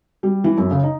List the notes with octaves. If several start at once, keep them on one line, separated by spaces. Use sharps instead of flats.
G3
E3
F#2
C#3
D#4